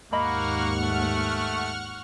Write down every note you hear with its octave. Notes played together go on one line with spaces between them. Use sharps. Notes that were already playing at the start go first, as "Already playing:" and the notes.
D#2 G#2 A#3 D#5 F#5 B5 C#6 F6
A3